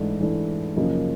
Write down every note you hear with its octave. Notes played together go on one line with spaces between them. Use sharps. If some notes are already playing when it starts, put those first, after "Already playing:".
Already playing: G#2 E3 A3 D4
G#2 E3 A3 D4
F#2 C#3 F3 A#3 D#4